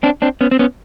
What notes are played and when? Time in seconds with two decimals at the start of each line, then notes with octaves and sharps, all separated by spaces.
0.03 C4 D4
0.22 C4 D4
0.41 B3 C#4
0.51 C4
0.59 B3 C#4